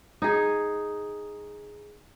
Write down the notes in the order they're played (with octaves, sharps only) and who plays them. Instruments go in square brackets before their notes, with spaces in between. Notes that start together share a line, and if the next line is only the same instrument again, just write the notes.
[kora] D#4 G#4